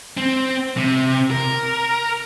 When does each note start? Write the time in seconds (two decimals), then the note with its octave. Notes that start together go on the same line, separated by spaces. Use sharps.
0.17 C4
0.77 C3
1.31 A#4